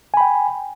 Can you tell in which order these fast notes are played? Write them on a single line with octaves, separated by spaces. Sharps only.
G#5 B5 G5